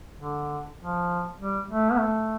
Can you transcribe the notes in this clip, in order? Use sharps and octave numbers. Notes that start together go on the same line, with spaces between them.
D3
F3
G3
A3
B3
A3